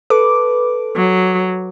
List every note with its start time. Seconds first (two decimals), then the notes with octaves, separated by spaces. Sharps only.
0.10 A4 B4 D6
0.96 F#3